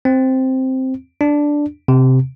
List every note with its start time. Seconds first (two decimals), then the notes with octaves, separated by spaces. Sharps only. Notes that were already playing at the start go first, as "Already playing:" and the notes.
0.05 C4
1.21 D4
1.88 C3